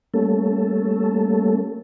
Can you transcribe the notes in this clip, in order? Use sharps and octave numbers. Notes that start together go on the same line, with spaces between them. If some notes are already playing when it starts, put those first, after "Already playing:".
G3 A3 A#3 C#4 A4